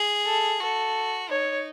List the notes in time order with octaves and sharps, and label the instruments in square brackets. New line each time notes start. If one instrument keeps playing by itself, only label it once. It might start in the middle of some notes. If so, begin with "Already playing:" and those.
Already playing: [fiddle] G#4
[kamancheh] A4
[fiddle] F#4 [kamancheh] A4
[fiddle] D#4 [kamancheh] C#5